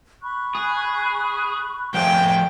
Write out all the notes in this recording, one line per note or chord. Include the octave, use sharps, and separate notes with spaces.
B5 C#6 F#6
G#4
F3 A3 G#4 G5